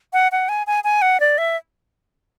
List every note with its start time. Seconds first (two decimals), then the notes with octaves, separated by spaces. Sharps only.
0.13 F#5
0.32 F#5
0.49 G#5
0.67 G#5
0.84 G#5
1.02 F#5
1.20 D5
1.38 E5